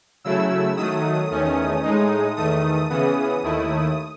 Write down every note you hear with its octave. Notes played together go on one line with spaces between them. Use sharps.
C#3 F#3 A3 E4 E6
D#3 F#3 A3 D#6
E2 D#3 A3 C#4
A2 G#3 D#4
E2 D#3 A3 D#6
C#3 E3 B3 D#6
D#2 D#3 A3 E4